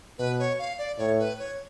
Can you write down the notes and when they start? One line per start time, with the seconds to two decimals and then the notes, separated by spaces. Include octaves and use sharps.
0.18 B2 B4
0.39 C#5
0.59 F5
0.78 D5
0.98 A2 C#5
1.19 B4
1.39 C#5